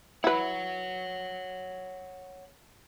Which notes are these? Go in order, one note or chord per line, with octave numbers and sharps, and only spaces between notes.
E4 B4 C#5 F#5